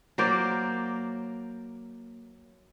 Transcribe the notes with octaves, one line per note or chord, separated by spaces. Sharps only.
F#3 A#3 C5 D5